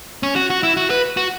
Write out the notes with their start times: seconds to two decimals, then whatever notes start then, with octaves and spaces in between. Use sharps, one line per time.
0.23 C#4
0.36 F#4
0.50 F#4
0.63 E4
0.77 F#4
0.90 B4
1.17 F#4